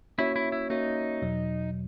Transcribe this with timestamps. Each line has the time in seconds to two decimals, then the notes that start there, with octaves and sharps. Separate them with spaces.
0.18 A#3 C#4 E4 F#4 C#5 E5
0.36 E4
0.52 E4
0.70 A#3 C#4 D#4 F#4 C#5 E5
1.22 E2 B2 F#3